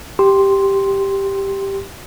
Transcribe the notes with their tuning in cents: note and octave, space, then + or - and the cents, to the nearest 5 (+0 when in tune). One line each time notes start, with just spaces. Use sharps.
G4 +0 C6 +0